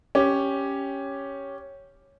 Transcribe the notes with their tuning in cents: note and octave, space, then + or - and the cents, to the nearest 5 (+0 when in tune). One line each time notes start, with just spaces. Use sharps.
C#4 +0 G4 +0